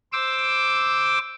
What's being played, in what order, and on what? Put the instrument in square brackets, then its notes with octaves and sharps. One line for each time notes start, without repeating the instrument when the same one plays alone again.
[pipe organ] C5 D6 E6